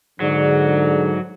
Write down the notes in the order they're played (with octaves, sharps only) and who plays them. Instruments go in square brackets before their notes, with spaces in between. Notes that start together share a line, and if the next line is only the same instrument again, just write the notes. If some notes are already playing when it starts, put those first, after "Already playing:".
[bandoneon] G#2 [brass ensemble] D3 [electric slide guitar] F#3 [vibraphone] G#4 D5